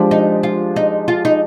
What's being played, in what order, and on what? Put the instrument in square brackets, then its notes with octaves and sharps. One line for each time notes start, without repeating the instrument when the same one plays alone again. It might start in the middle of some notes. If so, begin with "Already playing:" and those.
Already playing: [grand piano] F3 G#3 D4 G4
[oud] D#4
F4
D#4
F4
D#4